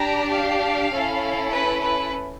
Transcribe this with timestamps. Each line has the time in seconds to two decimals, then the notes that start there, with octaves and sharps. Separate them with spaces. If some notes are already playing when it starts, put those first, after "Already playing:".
Already playing: D4 G4 A#5
0.32 F5
0.92 C#4 E4 A4
1.52 B4
1.82 B4